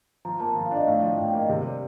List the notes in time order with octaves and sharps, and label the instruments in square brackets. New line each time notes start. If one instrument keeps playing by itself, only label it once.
[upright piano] F3 [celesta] A#5
[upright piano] A#3 [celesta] A5
[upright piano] F3 [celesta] A5
[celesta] F5
[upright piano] D4
[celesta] D#5
[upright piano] A2 [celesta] F5
[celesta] D#5
[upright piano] F3
[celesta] F5
[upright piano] A2 [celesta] G5
[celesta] G5
[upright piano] A#3
[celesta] D#5
[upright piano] C3
G3